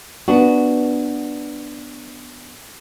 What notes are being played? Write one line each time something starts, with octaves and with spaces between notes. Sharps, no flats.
B3 D4 F#4